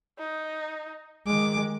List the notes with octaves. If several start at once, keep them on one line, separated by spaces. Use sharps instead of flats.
D#4
D#3 G#3 D6